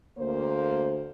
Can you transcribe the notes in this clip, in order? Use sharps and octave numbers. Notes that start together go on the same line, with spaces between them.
D2 A#3 C5